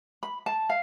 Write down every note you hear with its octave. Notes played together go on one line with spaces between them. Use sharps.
B5
A5
F5